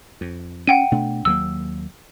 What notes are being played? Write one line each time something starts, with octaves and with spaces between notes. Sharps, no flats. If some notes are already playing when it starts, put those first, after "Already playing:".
F2
C#4 F#5 G5 D#7
B2 A3 D4
D#2 F#3 A#3 E6